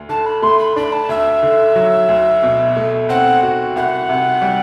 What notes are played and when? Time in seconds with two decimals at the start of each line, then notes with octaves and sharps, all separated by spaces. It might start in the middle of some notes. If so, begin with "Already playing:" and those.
Already playing: D2
0.09 D3 A5
0.26 B5
0.42 A3 C6
0.59 B5
0.76 D4 B5
0.92 A5
1.09 D2 E5
1.43 D3
1.76 F#3
2.09 D2
2.43 B2
2.76 A3
3.09 C4 F#5
3.43 F#4
3.76 C2 F#5
4.09 C3
4.42 G3